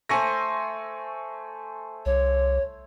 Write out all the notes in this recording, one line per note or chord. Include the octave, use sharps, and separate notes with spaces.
A3 C5 G#5 C#6 A#6
C2 C#5